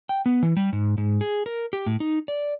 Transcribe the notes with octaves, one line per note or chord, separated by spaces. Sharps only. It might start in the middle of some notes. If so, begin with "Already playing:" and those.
G5
B3
E3
G3
G#2
G#2
G#4
A#4
G4
A2
D#4
D5